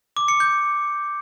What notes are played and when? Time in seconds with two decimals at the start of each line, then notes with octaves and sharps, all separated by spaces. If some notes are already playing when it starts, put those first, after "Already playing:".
0.17 D6
0.28 C#7
0.40 G6